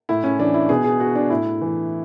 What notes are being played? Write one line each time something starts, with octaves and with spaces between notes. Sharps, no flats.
A2 E4
C#4
E3 D4
E4
B2 G#4
G#4
F#4
D4
A2 E4
E3